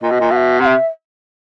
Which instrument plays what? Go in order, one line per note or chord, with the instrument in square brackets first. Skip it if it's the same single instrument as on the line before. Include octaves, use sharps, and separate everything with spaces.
[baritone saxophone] A#2 [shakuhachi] D#5
[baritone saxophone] B2
A#2
[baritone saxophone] B2 [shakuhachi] F#5
[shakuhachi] E5
[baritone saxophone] C3 [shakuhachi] F#5
[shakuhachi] E5